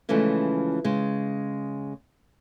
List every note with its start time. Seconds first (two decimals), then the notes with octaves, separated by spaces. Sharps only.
0.09 C#3 E3 F3 G#3 A3 C#4
0.84 C#3 G#3